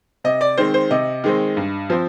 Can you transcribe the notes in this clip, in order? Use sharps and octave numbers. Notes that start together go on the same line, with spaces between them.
C3 D#5
D5
D#3 G#3 C4 C5
C5
C3 D#5
D#3 G#3 C4
G2
F3 C4